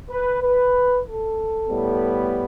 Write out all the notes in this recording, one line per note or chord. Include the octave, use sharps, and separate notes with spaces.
B4
B4
A4
A2 G3 B3